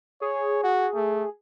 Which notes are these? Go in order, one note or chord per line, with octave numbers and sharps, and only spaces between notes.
G#4 C#5
F#4
A3